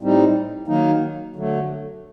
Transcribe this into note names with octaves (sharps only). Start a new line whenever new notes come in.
A2 G3 C4 D#4
D#3 F#3 A#3 D#4
D3 F#3 A3